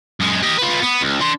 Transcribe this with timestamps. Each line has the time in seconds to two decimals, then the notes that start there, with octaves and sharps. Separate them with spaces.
0.20 F#2 G#3
0.42 G4 D#5
0.58 F4 B4
0.82 B3
1.02 C#2
1.21 D4 C6